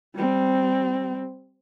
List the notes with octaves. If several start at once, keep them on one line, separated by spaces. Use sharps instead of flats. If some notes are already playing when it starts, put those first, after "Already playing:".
G3 C4